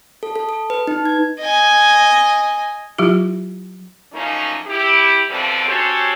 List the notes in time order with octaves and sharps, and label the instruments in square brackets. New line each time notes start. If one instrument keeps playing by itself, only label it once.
[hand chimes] A4
A4
A4
B4
D#4
G#6
[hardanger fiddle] D#5 G#5
[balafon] F#3 E4 F4 G4
[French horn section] F#2 F3 A3 A#3 C#4 D#4
E4 G4
B2 D3 E3 F3 G3 C4
C#4 F#4 G4 A4 C5 C#5